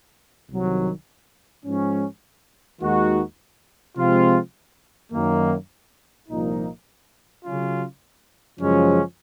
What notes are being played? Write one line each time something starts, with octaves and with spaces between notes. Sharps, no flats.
C2 C3 D#3 F#3
G#2 F3 G#3 C#4
D#2 D#3 G#3 D#4 F#4
C3 F3 G#3 C4 F4
F#2 D#3 A#3
C2 A#2 F3 A#3 D#4
C#3 F#3 C#4 F4
F#2 C#3 F3 G#3 C#4